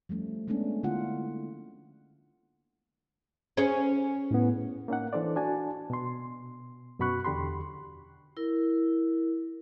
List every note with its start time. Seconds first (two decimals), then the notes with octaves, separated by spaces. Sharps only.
0.09 F3 G3 A3 C#4
0.48 G#3 A3 B3 C#4 D4
0.83 D3 A#3 E4 F4 F#5
3.57 C#4 G#4 C#5
4.31 A2 B3
4.88 A#3 C#4 D#4 F#5
5.13 E3 D4 A4 C5 D5
5.36 D4 F#4 G#5 A5
5.90 B2 C6
6.99 F#2 B2 F#4 B5 C#6 F#6
7.25 E2 D3 G4 B5 C6
8.37 E4 A#4